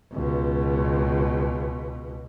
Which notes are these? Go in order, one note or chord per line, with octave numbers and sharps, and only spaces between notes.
C#2 B2